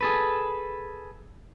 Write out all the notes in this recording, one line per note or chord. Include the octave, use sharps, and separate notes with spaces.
G#4 A4 B4